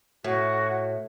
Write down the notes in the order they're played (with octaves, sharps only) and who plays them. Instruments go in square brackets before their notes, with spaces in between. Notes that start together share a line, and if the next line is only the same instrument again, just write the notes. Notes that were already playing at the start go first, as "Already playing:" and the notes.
[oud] A2 [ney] F#4